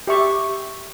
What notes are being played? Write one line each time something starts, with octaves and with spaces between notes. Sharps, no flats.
G4 E5 C#6 D6